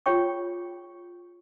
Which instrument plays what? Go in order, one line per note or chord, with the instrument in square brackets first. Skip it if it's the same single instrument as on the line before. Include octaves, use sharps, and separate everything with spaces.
[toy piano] F4 G#4 C#5 G5 C#6